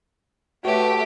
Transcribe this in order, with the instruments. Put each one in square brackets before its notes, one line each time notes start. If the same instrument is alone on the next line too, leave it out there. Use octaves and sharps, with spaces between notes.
[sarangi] A3 [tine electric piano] F#4 C#5 [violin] G4 [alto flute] B4